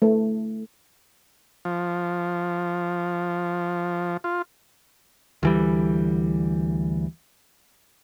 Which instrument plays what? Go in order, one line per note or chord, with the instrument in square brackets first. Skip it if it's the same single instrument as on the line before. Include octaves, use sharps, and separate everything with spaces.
[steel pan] A3
[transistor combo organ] F3
F4
[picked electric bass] D2 E3 G3